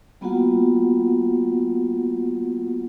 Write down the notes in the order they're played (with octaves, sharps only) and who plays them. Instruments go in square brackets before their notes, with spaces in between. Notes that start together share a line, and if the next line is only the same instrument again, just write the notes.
[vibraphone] G3 A#3 B3 F4 F#4 F#5